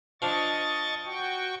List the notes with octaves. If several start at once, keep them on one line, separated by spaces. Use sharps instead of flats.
F3 D4 D#5 C#6 A6
F#4 G5 C#6